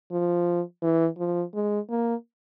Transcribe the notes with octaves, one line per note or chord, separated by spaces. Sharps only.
F3
E3
F3
G#3
A#3